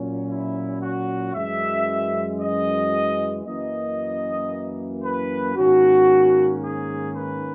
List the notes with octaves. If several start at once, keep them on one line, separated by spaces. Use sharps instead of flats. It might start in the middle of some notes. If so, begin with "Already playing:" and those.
Already playing: A#2 F#3 C#4
E4
F#4
F#2 E3 G#3 E5
D#5
F#2 E3 A#3 D#5
B4
G#2 D#3 A#3 C#4 F#4
G#4
B4